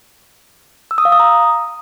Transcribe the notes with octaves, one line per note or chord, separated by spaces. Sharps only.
E6
D#6
F5
D#6
A#5